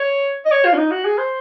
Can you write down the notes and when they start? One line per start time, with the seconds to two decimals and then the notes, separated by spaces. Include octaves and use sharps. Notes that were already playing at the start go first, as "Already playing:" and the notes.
Already playing: C#5
0.45 D#5
0.52 C#5
0.65 F4
0.73 C#4
0.77 D#4
0.91 F#4
1.05 G#4
1.18 C5